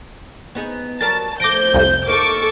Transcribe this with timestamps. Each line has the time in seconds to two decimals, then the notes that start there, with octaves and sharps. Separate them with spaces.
0.55 B3 D#4 G#4
1.01 F#3 G3 A#4 A5 A6
1.40 F3 A3 D6 G6 A#6 D7
1.74 C2 F2
2.07 A#3 D#4 A4 C#6 D6